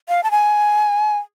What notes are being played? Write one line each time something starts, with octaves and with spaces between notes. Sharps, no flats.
F5
A5
G#5